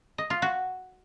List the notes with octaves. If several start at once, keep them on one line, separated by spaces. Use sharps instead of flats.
D#5
F4
F#4